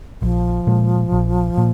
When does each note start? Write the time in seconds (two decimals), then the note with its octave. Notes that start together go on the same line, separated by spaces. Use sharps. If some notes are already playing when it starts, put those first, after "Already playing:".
0.22 A#1 F3
0.67 A#2 G#3
1.12 A#1
1.58 A#2